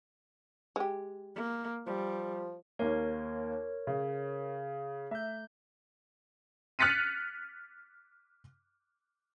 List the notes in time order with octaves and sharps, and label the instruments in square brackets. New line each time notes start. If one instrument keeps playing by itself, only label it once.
[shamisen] G#3 G4
[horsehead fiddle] A#3
[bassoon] F3 [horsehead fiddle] G3
[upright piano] D#2 A#3 [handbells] A#4 C#5
[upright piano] C#3
[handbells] A3 G6 [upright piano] E5
[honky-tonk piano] F6 F#6 A6 B6 C#7 D#7